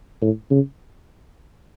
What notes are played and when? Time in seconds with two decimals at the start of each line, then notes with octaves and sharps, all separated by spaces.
0.21 A2
0.50 C#3